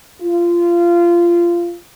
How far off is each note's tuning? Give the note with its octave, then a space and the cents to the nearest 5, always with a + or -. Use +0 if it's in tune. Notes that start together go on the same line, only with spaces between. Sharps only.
F4 -20